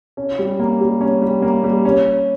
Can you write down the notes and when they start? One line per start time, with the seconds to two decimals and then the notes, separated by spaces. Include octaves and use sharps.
0.17 C#4
0.39 G3
0.59 A#3
0.81 G3
1.01 C#4
1.22 G3
1.42 A#3
1.64 G3
1.85 C#4